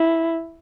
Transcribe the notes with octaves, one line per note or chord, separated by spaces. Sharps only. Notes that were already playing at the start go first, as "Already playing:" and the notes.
Already playing: E4